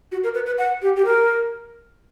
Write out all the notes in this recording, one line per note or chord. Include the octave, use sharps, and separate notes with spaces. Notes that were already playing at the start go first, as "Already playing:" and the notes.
F#4
A#4
B4
B4
F#5
G4
G4
A#4